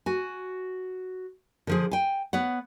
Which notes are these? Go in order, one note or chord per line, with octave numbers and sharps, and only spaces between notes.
F#4 G#5
D3 F3 G#4
G5 G#5
B3 C#5 F#5